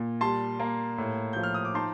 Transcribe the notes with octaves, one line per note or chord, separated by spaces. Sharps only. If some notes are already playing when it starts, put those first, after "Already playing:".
Already playing: A#2
G3 A5 C6
A#3
A2
F3 G6
F6
D#6
D6
D#4 A5 C6